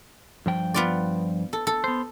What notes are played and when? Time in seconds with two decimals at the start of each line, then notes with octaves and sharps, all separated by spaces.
0.46 G2 F3 G5
0.74 B3 F4 D5
1.53 A4
1.67 A4
1.84 B3 C5